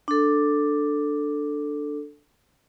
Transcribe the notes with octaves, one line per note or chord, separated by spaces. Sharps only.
D4 A4